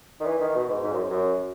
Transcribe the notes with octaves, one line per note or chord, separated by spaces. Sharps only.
D#3
E3
D#3
B2
G#2
G#2
F#2
F#2